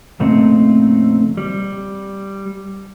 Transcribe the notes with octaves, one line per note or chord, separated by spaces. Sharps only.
F2 A#2 C#3 A3 C4 D#4
G3